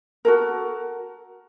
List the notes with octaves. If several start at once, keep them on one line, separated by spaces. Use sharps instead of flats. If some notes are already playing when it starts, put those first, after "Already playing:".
F#4 A4 A#4